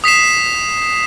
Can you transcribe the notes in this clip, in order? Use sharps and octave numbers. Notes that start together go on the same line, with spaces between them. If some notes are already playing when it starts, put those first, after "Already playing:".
D#6 B6 C7 E7